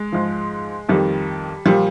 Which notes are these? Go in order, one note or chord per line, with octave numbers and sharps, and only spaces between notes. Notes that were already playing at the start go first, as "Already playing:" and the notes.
Already playing: G#3
G#2 F3
F2 D#3 G3
A#2 F3 G3